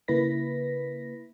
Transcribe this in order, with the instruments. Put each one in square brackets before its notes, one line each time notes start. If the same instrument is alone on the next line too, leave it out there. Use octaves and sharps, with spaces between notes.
[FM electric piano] C#3 A#3 E4 B4 A#6 B6